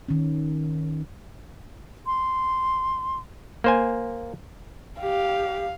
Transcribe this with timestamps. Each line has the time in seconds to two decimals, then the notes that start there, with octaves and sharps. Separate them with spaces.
0.09 D#3 C#4
2.06 C6
3.64 A#3 C5 G#5
5.00 G4 F5